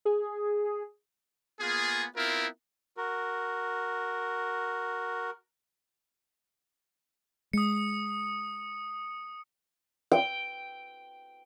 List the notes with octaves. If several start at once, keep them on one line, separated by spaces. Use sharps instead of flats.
G#4
A#3 B3 F4 G#4
B3 C4 E4 F4 A#4
F#4 A#4
G#3 D#6 C#7
G5